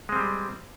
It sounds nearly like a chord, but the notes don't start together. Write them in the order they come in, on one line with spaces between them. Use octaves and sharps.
G#3 C4 G3